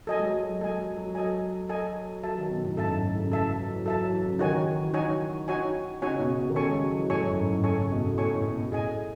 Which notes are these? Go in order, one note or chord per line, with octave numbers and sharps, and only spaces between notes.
F#3 A4 D#5 G#5
G#3
F#3
F#3
G#3 A4 D#5 G#5
F#3
F#3
A4 D#5 G#5
A4 D#5 G#5
F#3 A4 E5 A5
D#3
B2
A2
F#2
G#2 A4 E5 A5
A2
A2
C#3
E3 A4 E5 A5
E3
F#3
E3
F#3 A4 E5 A5
F#3
E3
C#3
D#3 D#4 F#4 C#5 G#5
F#3
E3
D#4 F#4 C#5 G#5
D#4 F#4 C#5 G#5
C#3 D#4 F#4 C#5 G#5
B2
B2
D#3
C#3 A4 C#5 G#5 C#6
G#3
F#3
E3
A2 A4 C#5 G#5 C#6
F#2
G#2
A2
C#3 A4 C#5 G#5 C#6
C#3
B2
A2
A2 A4 C#5 G#5 C#6
A2
B2
B2
A2 G#4 D#5 G#5